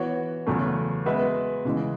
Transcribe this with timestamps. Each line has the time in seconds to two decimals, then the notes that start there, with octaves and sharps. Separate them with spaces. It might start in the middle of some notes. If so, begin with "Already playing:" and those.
Already playing: E3 B3 F#4 C#5
0.47 E2 C#3 F#3 A3 C#4
1.05 G#3 B3 F#4 B4 E5
1.65 C#3 E3 G#3